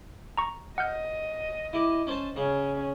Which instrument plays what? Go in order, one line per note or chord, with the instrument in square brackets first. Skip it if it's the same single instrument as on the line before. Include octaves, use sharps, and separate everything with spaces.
[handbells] A#5 C#6
[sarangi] D#5 [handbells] F#5 F6 G6
[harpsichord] E4 G4
C#4 C5 A5
[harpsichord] C#3 [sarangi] C#4